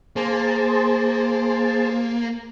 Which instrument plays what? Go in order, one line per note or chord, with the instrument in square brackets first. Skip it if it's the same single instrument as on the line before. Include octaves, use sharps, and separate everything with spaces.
[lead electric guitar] A#3 [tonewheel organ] G#4 C5 A5